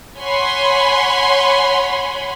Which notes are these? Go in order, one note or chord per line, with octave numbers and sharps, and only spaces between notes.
C#5 F#5 G#5 B5 C6